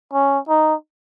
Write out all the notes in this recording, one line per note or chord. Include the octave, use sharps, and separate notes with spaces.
C#4
D#4